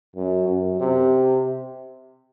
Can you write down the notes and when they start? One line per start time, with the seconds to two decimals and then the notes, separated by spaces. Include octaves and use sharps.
0.16 F#2
0.47 F#2
0.80 C3